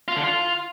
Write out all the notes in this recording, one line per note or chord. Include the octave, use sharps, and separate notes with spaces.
F4
D3
F4